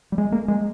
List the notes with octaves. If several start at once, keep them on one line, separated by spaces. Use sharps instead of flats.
G3
G#3
A#3
G#3